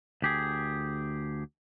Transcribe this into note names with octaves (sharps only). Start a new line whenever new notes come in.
D2 G4 G#4